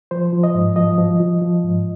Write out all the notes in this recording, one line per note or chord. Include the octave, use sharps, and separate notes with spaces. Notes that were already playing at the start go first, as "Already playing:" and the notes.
F3 C5
F3
D#5
G#2
F3 D#5
F3
F3
F3
G#2